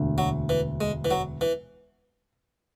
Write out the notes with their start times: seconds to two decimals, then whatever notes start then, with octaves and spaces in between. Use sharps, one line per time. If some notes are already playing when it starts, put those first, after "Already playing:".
Already playing: E1 D2 D3
0.18 F#3
0.49 E3
0.81 G#3
1.05 E3
1.11 F#3
1.41 E3